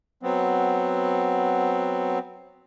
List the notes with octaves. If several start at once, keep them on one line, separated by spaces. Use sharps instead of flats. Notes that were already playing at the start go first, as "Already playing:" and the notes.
F#3 B3 C4